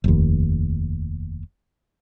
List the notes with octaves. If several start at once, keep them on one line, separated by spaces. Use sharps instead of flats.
F1 D#2